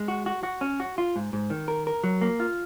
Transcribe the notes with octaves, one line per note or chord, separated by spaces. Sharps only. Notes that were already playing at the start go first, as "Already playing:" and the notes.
Already playing: G#3
F#4
F#4
F#4
C#4
F#4
F4
G#2
G#2
D#3
A#4
A#4
F#3
A#3
F4